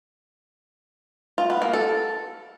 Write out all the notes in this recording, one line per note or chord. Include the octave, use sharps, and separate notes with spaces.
F4
B3
A#3
A4